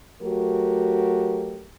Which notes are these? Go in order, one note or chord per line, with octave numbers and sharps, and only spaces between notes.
F#3 A3 F#4 G4 A#4